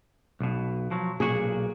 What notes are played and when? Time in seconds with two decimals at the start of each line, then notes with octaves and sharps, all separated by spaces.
0.40 B1 B2
0.91 F3 F#3
1.20 B1 A#2 F#4 G#4